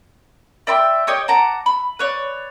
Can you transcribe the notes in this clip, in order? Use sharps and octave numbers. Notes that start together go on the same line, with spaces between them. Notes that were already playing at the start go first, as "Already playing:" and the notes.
D5 E5 G5 C6
G4 C#5 D#5 G5
F#5 A5 A#5 D6
B5
B4 C#5 D5